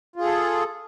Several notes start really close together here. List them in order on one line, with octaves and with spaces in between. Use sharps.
F4 G#4 A4